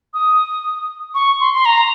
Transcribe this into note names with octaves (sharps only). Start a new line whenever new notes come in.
D#6
C#6
C6
C6
A#5